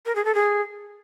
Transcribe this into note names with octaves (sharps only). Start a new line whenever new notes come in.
A#4
G#4
A4
G#4